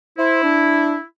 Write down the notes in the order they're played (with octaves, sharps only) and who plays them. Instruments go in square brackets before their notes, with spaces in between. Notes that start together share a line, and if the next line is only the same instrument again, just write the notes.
[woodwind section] E4 [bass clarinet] C5
[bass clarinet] D4